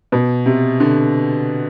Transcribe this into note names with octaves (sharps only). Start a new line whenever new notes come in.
B2
C3
D3